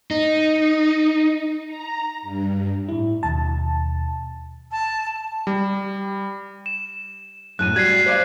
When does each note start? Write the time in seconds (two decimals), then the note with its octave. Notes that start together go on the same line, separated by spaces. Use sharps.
0.11 D#4
1.66 A#5
2.22 G2
2.89 A2 E4
3.23 D#2 B2 A5
4.72 A5
5.47 G3
6.66 E7
7.59 F#2 A2 F#6 D#7
7.76 G3 F#4 G#6 B6 C7
8.06 C5 D5 F5